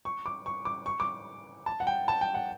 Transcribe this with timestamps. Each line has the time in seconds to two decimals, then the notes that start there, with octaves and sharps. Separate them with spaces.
0.05 C#6
0.26 D6
0.46 C#6
0.65 D6
0.86 C#6
1.00 D6
1.66 A5
1.80 F#5
1.87 G5
2.08 A5
2.21 G5
2.34 F#5